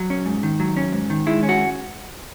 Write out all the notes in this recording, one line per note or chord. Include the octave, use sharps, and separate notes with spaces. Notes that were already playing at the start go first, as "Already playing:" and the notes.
Already playing: F#3
C#4
G#2
D#3
F#3
C#4
G#2
D#3
G#3 E4
C#4
F#4